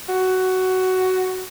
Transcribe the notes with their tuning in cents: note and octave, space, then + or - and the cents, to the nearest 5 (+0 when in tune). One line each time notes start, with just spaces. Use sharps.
F#4 +10